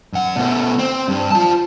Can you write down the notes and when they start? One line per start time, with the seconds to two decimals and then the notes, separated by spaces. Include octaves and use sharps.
0.13 F#2 F#5
0.36 B2 A3
0.79 C4
1.08 G2
1.31 F4 A5